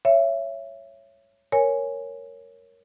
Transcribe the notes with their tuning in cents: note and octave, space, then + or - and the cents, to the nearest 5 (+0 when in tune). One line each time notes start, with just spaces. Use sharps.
C#5 +0 E5 +25
A#4 +0 C#5 +0 G#5 +0